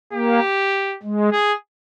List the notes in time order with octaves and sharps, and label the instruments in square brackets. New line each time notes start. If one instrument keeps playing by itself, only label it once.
[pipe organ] A#3 [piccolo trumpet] G4
[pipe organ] G#3
[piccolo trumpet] G#4